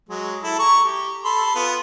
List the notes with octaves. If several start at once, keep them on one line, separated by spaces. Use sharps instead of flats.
F#3 G#3
E4 A4
A#5 C#6
G4
A4 B5 C6
B3 F4